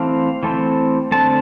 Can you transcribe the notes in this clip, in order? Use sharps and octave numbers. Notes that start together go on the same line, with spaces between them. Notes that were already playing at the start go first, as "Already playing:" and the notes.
Already playing: E3 A3 C4 F5
E3 A3 C4
D3 A3 C4 A5